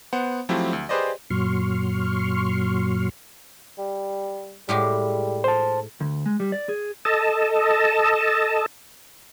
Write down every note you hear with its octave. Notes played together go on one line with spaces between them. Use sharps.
B3 C5 F#5
F3 F#3 A3 C4 E4 G4
D2
G4 G#4 B4 C5 D5 D#5
F#2 A#2 F#3 C6 C#6 F6
G3
A2 G3 G#3 G4
C5 A5
D2
G#3
G3
D5
G#4
A4 D#5 A5